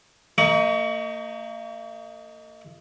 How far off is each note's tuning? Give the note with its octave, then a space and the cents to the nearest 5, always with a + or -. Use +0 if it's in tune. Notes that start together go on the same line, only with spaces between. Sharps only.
A#3 -45 D#4 +5 C#6 +35